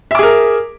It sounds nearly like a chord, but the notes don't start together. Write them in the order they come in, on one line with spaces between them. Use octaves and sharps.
E5 D6 G#4 A#4